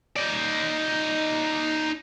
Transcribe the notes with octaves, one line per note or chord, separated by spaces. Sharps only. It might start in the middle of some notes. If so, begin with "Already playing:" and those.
D#4 D5